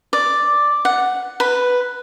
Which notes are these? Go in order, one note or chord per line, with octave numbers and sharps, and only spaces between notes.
D5
F#5
B4